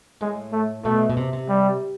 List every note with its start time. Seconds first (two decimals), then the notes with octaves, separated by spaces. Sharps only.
0.21 A2 G#3
0.52 A3
0.84 B2 A3
1.10 B2
1.17 C3
1.33 C3
1.49 G3